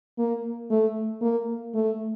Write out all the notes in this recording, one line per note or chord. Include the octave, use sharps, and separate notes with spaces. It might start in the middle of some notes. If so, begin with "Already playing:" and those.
A#3
A3
A#3
A3